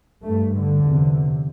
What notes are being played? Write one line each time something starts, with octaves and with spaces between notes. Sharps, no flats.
G2 A3
D3
E2 C3